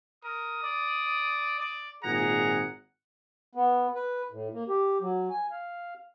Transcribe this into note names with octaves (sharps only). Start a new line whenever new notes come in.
A#4 D#6
D5
D5
G#1 A#2 G#4 F#5 A#5
B3
B4
A2
A#3
G4
F#3
G#5
F5